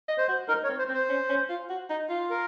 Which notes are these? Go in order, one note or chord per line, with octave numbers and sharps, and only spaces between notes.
D#5
C5
F#4
D#4 A#4
C#5
C4
C5
C4
C5
C#4
C#4
F4
F#4
D#4
F4
A#4